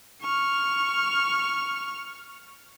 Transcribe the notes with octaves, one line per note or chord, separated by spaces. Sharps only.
C#6 F6